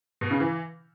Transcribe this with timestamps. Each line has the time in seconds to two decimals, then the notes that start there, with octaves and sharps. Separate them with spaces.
0.21 B2
0.31 C#3
0.40 E3